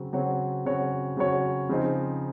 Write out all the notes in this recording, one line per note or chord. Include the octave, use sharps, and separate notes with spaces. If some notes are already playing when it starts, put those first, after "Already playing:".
Already playing: C#3 F#3 C4 F#4
C#3 F#3 C4 F#4 C#5
C#3 F#3 C4 F#4 C#5
C#3 F#3 C4 F#4 C#5
C#3 F3 C4 D#4